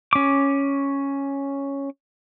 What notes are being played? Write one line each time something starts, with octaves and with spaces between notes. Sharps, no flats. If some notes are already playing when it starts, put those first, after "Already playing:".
C#4 D6